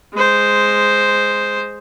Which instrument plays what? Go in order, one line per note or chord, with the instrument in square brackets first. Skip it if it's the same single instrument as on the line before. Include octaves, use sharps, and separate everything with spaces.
[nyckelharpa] G#3 C5